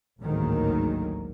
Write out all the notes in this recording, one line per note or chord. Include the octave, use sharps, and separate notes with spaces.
A1 D2 G#2 D#3 F#3 A#3